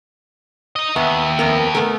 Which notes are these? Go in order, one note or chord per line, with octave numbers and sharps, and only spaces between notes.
D#4 D#5
D#2 B3 E5
F2 B3 A#4
A3 B3 A#4